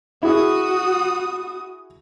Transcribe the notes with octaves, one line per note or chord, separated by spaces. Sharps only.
E4 F#4 G#4 D#6